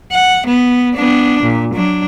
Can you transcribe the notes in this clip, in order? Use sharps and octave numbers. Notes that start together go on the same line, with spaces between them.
F#5
B3
B3 D4
A#2
F#3 D4